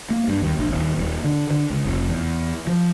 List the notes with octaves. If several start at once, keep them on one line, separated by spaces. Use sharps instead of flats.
A#3
G2
D#2
A#1
D#1
D#1
D3
D3
C#2
F1
E2
F3